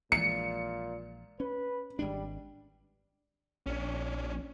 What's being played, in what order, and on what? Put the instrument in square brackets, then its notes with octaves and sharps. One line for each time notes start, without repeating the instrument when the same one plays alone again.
[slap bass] A#1 E3 G#3 [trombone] A#2 [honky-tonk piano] C#7
[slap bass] C#4 [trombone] B4
[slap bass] G#1 G#3 D4 [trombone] G3
[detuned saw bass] A#1 [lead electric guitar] C#4 D4